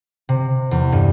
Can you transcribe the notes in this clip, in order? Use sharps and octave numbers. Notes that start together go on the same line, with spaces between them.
C3
E2
G2